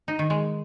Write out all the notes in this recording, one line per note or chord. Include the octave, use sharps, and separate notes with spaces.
D#4
D#3
G#3